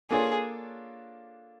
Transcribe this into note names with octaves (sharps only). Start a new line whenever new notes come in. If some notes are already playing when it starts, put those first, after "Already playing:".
A#3 D4 F4 G#4 A4 C#5